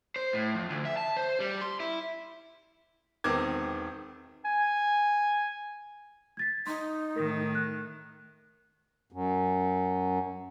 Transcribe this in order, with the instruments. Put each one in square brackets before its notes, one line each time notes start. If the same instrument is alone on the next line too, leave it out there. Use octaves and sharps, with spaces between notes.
[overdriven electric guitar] C5
A2
F2
D2
E5
A5
C5
G3
C6
E4
[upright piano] E1 D#3 B3 C4 D6 G#6
[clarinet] G#5
[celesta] G#6 A6 B6
[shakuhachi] D#4 [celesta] C6
[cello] A2 D#3 [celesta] A#4
[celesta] F#6
[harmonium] F#2